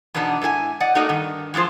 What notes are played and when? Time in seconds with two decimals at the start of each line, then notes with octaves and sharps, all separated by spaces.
0.14 E2 B2 B3 D4 D#4
0.41 G#2 E4 G#4 G#5
0.80 D5 D#5 F#5
0.95 A3 A#3 D#4 F#4 D5 D#5
1.09 G2 D#3
1.54 E3 F3 G#3 F4 C5